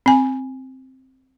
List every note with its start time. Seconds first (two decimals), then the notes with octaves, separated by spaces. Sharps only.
0.06 C4 G#5